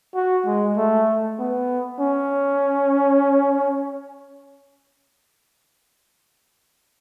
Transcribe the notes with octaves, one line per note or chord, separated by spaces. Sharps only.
F#4
G#3
A3
B3
C#4